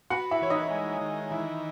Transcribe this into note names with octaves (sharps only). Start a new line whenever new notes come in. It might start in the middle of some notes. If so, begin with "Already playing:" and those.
B3 F#4 F#5
E4 E5
E3 C#5
D#4 D#5
G#3
D#3
E3 E4